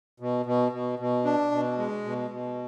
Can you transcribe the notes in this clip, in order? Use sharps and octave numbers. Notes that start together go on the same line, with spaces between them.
B2
B2
B2
B2
D4
B2
G#3
B2
B2